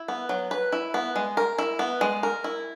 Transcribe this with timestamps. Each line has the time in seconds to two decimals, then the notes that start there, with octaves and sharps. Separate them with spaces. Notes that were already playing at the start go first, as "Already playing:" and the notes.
Already playing: E4
0.08 B3
0.29 F#3
0.51 B4
0.72 E4
0.94 B3
1.16 G#3
1.37 A#4
1.59 E4
1.79 B3
2.01 G#3
2.23 A#4
2.44 E4